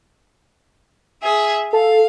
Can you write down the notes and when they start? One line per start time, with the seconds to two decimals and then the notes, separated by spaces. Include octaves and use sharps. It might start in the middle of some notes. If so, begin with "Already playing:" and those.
1.23 G#4 E5
1.73 A4 F5